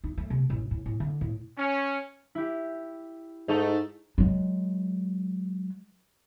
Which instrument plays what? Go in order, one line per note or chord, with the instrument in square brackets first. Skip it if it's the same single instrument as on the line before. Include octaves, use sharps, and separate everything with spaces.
[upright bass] D#4
A3
C3
A1
A2
A2
D3
A2
[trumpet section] C#4
[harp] E4 G4
[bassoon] G#2 [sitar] A3 D#4
[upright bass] F#3 G#3